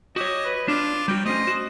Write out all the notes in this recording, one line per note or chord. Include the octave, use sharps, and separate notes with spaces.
F#4 G4 C#5 D#5
B4
D4 F4 D5
G3 F#4 G5
A3 C#4 C5 D#5
F#4